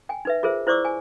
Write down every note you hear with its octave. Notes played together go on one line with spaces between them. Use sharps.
G5 G#5
D#4 B4 E5
F4 G#4 A#4 C5 E5
E4 C5 D5 C#6 D6 E6
G#5